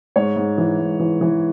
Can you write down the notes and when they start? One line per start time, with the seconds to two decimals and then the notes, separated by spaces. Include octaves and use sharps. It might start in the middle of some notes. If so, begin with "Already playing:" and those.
0.16 G#2 C#5
0.36 G#2
0.58 E3
0.79 G#2
1.00 E3
1.21 E3